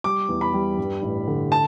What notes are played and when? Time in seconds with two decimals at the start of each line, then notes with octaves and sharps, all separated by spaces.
0.04 G3 D6
0.29 E2
0.41 B5
0.53 G3
0.77 G2
1.02 A1
1.27 D3
1.52 A5